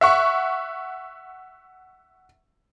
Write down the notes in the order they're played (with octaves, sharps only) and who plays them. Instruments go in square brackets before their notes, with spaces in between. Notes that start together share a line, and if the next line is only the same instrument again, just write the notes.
[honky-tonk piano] E5 F#5 C#6